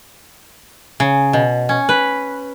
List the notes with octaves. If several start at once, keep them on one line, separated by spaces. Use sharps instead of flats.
C#3
B2
C#4
B4